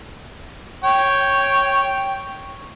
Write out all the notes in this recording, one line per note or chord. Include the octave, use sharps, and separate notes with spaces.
C#5 G5